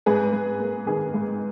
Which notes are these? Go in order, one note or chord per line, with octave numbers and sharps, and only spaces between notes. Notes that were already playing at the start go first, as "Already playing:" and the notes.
G#2 G#4 B4
G#2
A#3
D#3 G#4 B4
G#2